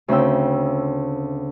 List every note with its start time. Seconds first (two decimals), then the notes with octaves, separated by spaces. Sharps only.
0.08 D2 C#3 C4 C#4 G5 E6